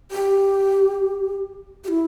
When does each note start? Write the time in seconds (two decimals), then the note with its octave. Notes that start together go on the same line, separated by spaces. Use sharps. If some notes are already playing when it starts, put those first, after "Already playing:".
0.11 G4
1.84 G4
1.88 E4